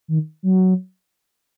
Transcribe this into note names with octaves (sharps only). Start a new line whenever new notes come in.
D#3
F#3